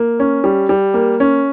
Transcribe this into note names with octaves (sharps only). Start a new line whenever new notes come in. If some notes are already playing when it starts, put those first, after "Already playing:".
Already playing: A#3
C#4
G3
G3
A#3
C#4